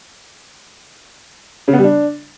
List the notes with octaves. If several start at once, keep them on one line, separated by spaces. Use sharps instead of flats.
C#3
B3
G3
D4